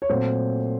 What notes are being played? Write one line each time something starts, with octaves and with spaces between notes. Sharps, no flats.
C#5
A#2 F#3 A3 C4 C5